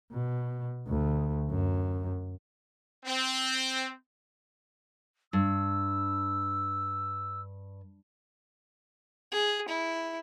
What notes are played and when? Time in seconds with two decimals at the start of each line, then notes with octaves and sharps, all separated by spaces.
0.12 B2
0.87 D2
1.50 F#2
3.05 C4
5.33 G2 E6
9.32 G#4
9.68 E4